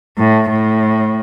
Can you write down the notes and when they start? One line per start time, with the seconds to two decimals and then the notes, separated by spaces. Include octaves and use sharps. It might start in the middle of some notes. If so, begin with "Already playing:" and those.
0.18 A2
0.50 A2